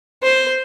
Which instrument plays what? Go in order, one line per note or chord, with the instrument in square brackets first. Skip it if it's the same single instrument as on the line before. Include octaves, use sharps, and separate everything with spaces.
[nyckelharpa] C5